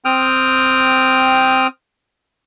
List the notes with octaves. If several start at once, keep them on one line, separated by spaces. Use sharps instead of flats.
C4 G5 D#6 F6